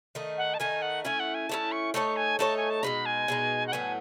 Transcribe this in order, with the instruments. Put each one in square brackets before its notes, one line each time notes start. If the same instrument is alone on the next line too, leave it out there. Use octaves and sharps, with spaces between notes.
[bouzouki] D#3 A3 D#4
[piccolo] F#5
A5
[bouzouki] D#3 A3 D#4 [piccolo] G#5
[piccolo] F#5
[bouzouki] A3 C#4 E4 [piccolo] G#5
[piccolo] F#5
G#5
[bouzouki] A3 C#4 E4 [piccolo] A5
[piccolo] C#6
[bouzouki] A3 D#4 A4 C#5 [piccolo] C#6
[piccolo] G#5
[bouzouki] A3 D#4 A4 C#5 [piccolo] A5
[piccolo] G#5
A5
[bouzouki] B2 G#3 D#4 [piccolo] B5
[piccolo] G#5
[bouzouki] B2 G#3 D#4
[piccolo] F#5
[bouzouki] A2 F#3 B3 [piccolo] G#5